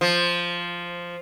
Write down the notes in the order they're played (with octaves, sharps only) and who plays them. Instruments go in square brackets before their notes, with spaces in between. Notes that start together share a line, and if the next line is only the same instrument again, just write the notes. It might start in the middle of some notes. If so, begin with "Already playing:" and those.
[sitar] F3